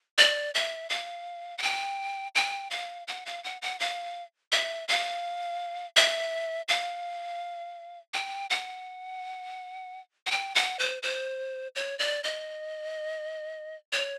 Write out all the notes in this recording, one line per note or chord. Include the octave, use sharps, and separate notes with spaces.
D5
E5
F5
F#5
G5
G5
F5
F#5
F5
F#5
F#5
F5
E5
F5
E5
F5
G5
F#5
F#5
G5
F#5
C5
C5
C#5
D5
D#5
C#5